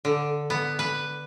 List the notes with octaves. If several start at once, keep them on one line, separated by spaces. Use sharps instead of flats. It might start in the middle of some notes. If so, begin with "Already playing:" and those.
D3
B3
B4